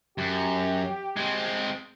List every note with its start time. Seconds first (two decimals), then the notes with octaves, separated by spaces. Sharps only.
0.18 F#2 G4
1.17 G#3 C4